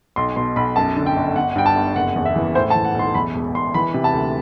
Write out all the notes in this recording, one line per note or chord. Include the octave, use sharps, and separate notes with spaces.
B1 C6
B2 C6
B1 B5
F#2 A5
D3
G5
G1
G1 F#5
G2 G5
A5
G1
F#1 F#5
E2
E5
E3
A2 C5
A5
E3
F#5
B1 C6
E2 B5
E1
E1 C6
E3 B5
C3
A5
D2